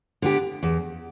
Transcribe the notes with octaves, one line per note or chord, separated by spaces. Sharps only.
D3 B3 G4
E2